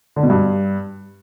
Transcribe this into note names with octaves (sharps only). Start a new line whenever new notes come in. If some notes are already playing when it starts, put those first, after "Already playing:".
D3
B2
G2